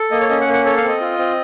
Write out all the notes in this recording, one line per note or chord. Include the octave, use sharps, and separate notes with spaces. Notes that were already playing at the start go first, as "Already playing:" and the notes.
Already playing: A4
A#3 D#5
C#5
C#4 D#5
F#5
A#3
F#5
A4 C#5
F5
C4
D#5
F4
C4